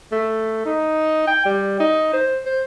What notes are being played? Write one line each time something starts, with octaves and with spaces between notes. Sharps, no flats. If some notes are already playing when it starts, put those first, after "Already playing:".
A3
D#4
G5
G3
D#4
C5
C5